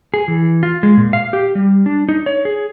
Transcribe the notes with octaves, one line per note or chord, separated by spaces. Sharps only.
G#4
E3
F4
G#3
A#2
F5
G4
G3
D4
D#4
C#5
G#4